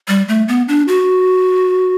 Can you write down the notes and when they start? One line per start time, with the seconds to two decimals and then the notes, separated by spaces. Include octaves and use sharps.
0.08 G3
0.29 A3
0.48 B3
0.68 D4
0.88 F#4